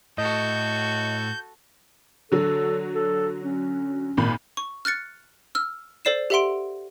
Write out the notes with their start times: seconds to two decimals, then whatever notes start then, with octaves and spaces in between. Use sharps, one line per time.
0.18 A2 F#4 A4 D#5 G6
2.32 D3 F#3 A4
2.95 A4
3.43 C#4
4.17 G#1 A#2 B5
4.57 C#6
4.85 F6 F#6 A6 C#7
5.55 E6 F6
6.05 A4 C5 D5 C7 E7
6.30 G4 A4 E5 F#5 C6 D7